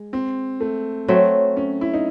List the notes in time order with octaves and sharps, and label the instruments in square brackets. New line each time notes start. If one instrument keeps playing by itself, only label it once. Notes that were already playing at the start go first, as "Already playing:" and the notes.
Already playing: [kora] G#3
[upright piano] C4
A3
[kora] F#3 A3 C4
[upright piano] C#4
E4
D#4